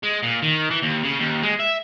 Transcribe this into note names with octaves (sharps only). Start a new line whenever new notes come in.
G#3
A#2
D#3
E3
D#2
C#3
D#2
G#3
E5